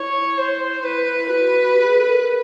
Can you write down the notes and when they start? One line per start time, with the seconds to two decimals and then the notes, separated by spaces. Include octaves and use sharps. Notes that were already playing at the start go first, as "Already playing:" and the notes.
Already playing: E4 C#5
0.38 C5
0.83 E4 B4
1.29 F#4 B4
1.75 G4
1.86 G#4
1.97 A4
2.08 A#4